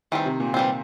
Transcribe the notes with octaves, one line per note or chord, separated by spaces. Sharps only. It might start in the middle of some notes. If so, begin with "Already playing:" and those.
D#3 E3 G3 C4
C3
A#2
E3 G3 C4